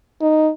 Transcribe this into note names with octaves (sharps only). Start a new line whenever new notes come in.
D#4